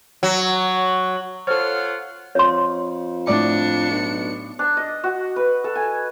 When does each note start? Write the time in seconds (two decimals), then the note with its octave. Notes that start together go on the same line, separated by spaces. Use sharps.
0.23 F#3
1.47 F4 A4 C5 C#5 F#5 F6
2.35 F2 C#5 C6
3.27 A2 D4 D5 D6 C#7
3.91 B1
4.59 D4
4.77 D#5
5.04 F#4
5.36 B4
5.64 A4
5.75 G#5